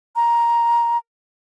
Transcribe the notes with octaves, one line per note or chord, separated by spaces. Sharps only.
A#5